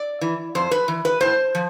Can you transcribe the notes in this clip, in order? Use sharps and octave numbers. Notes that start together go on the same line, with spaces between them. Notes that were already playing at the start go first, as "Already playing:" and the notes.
Already playing: D5
E3
F2 C5
B4
E3
B4
A2 C5
F3